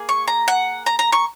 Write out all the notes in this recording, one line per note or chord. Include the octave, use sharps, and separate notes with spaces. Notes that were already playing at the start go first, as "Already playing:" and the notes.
Already playing: A#3 G#4
C#6
A#5
F#5
A#5
A#5
C#6